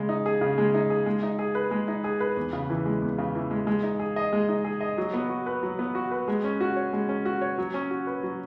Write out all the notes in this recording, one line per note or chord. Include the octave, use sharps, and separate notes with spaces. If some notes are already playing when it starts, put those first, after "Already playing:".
Already playing: C#3 G#3
D#4
G#4
C#3
G#3
D#4
G#4
G#3
D#4
G#4
B4
G#3
D#4
G#4
B4
E2
C#3
E3
G#3
E2
C#3
E3
G#3
G#3
D#4
G#4
D#5
G#3
D#4
G#4
D#5
F#3
B3
F#4
B4
F#3
B3
F#4
B4
G#3
C#4
F#4
C#5
G#3
C#4
F#4
C#5
F#3
C#4
F#4
B4
F#3